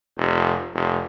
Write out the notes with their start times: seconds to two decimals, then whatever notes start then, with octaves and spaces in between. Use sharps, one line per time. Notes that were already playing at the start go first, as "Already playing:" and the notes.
0.17 F1
0.74 F1